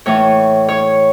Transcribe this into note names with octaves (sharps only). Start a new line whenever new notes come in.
A2 E3 C#5
C#5